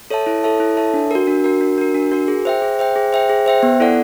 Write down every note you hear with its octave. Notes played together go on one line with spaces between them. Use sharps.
A4 C#5 E5 A5
E4
A4 C#5 E5 A5
E4
A4 C#5 E5 A5
D4
F#4 A#4
D4
F#4 A#4
D4
F#4 A#4
D4
F#4 A#4
G#4
C5 E5 G5
G#4
C5 E5 G5
G#4
C5 E5 G5
G#4
C5 E5 G5
B3
E4 A4 D5 F#5